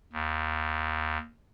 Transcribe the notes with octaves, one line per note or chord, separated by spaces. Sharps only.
D#2